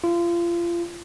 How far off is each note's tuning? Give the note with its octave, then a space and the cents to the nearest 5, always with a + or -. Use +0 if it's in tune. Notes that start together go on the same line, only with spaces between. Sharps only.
F4 -30